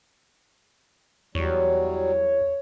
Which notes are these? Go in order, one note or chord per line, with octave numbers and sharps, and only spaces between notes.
E2 F#3 G3 C#5